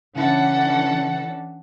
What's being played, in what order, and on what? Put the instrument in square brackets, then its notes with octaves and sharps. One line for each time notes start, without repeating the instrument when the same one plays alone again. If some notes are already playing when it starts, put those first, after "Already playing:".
[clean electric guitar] C#3 E4 [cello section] E3 C#4 D4 [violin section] A4 F#5